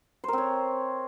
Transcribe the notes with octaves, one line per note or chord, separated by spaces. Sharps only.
C4 A#4 C5 C#5